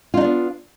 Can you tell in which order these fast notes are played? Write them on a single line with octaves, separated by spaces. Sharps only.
F4 D#4 D4 B3